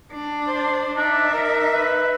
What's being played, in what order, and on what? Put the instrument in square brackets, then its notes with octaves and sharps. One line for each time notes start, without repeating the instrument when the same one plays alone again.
[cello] D4
[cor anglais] C5
[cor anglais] D4 [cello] D#4 E5
[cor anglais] A#4
B4